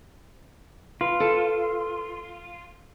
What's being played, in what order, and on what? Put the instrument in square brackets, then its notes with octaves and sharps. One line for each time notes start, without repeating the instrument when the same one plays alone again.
[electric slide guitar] F4 [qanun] B4
[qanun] A4